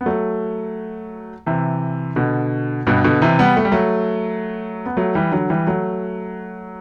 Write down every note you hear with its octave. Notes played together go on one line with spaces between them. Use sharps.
B3
F#3 A3
C3 E3
B2 D3
G2 B2
B2 D3
C3 E3
G3 B3
A3
G3
F#3 A3
B3
F#3 A3
E3 G3
D3 F#3
E3 G3
F#3 A3